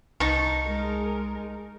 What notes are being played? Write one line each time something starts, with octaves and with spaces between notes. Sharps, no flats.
C2 D#4 A5 C#6
G#3 A#4